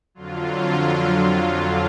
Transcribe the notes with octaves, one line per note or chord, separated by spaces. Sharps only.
F2 D3 F#3 F4